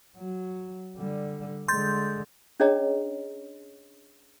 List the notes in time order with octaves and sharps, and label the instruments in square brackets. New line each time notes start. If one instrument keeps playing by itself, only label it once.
[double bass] F#3
D3 G3
[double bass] D3 G#3 [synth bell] C6 G6 A6
[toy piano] C#4 D4 G#4 C#5 D#5 A#5